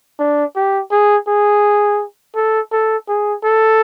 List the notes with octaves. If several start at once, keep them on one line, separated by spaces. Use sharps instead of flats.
D4
G4
G#4
G#4
A4
A4
G#4
A4